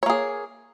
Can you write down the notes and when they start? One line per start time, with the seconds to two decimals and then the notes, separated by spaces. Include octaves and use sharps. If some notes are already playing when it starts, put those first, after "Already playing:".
0.03 C#5
0.06 A#3
0.10 G#4